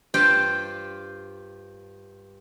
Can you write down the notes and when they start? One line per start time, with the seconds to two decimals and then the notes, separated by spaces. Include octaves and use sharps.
0.14 G2 F4 G4 C5 G5 A5